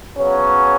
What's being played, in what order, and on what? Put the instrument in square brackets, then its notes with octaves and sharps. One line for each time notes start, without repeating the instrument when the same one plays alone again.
[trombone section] C#3 F#3 B3 C#4